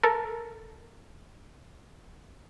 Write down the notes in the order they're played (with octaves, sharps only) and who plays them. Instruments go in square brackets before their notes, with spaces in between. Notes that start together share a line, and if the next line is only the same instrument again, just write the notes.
[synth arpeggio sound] A4 A#4